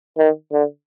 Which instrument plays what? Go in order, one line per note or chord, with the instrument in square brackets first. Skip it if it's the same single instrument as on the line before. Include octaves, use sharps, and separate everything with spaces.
[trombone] D#3
D3